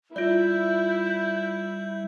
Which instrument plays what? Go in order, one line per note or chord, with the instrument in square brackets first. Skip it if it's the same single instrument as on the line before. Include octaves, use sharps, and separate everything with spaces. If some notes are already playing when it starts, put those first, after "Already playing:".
[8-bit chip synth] G3 [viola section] E4 [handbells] F4 D5 [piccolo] G6